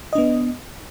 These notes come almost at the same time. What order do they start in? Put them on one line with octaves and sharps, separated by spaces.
D#5 D4 B3